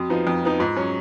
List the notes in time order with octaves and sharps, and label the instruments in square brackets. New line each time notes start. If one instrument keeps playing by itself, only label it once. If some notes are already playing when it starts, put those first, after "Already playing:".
Already playing: [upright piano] F2 [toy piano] F#4
[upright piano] F3 B3 D#4
F2
F3 B3 D#4
[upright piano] G#2 [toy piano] F4
[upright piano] F#3 C#4